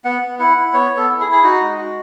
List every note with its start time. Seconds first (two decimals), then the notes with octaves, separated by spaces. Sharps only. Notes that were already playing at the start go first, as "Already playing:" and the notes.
0.05 B3 F#5
0.22 B3
0.39 E4 F#5
0.57 E4
0.73 B3 C#5
0.92 B3
0.97 A4
1.09 E4
1.20 G#4
1.27 E4
1.32 G#4
1.43 D#4 F#4
1.61 G#3
1.78 F#4